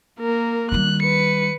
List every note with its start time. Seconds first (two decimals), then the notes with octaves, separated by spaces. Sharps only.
0.20 A#3 A#4
0.72 D#3 G3 F#6
1.02 B4 C#7